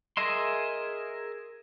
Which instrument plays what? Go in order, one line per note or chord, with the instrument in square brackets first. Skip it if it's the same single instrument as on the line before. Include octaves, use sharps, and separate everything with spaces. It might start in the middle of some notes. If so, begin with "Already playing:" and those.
[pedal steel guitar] G#4 A#4 D#5 E5 C6